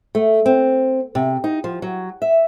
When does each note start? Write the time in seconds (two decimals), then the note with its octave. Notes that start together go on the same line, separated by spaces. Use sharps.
0.15 A3
0.46 C4
1.15 C3
1.44 D#4
1.64 F3
1.82 F#3
2.22 E5